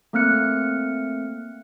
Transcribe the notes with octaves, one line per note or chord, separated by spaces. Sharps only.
A3 A#3 C4 F6 F#6 C#7